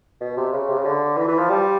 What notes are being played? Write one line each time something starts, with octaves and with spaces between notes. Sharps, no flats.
B2
C3
C#3
C3
C#3
D3
E3
E3
F3
G3